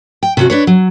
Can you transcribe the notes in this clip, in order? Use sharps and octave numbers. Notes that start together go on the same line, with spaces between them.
G5
C3 C#4 F#4
D4 B4 C#5
F#3